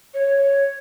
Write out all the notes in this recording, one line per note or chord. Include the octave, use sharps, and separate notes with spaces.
C#5